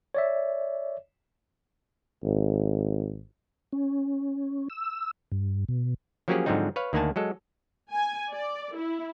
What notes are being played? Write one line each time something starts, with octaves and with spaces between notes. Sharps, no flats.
C#5 D5 E5
G#1
C#4
E6
G2
B2
F3 F#3 A#3 C#4 G4 G#4
G#2 D3 F3 F#3 C4 D#4
B4 C#5 F5
D2 D#3 A#3 F#5 G#5 A5
F#3 G#3 A4
G#5
D5
E4